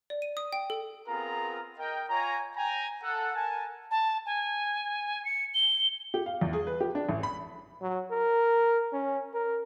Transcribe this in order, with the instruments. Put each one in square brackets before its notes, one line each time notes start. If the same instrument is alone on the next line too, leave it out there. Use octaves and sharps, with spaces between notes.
[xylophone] D5
D#7
D#6
G5
A4
[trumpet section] B3 C4 F4 G#4 A#4 A#5
A#4 D#5 G5
F4 C#5 G#5 A#5
G5 G#5 A#5
A4 F#5
A#4 G#5 A5
[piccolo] A5
G#5
C#7
G7
[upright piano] G4
F5
E2
G#4
B4
G4
D4
A1
B5
[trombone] F#3
A#4
C#4
A#4